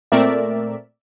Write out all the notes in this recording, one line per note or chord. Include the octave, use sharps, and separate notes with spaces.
A#2 A3 C4 A#4 D5 E5